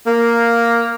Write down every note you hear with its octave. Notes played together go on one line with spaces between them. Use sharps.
A#3